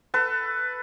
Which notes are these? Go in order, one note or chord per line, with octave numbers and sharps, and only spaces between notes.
A4 B4